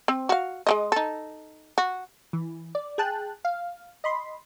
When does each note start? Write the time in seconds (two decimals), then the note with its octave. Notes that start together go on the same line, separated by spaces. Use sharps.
0.08 C4
0.29 F#4 F5
0.67 G#3 A#3 D#5
0.92 D#4 A4
1.78 F#4
2.33 E3
2.75 D5
2.98 G#4 G5 A5 F#6
3.45 F5
4.04 D#5 B5 C6